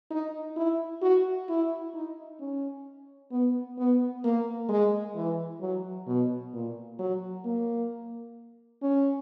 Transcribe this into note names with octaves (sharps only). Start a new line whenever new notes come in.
D#4
E4
F#4
E4
D#4
C#4
B3
B3
A#3
G#3
E3
F#3
B2
A#2
F#3
A#3
C#4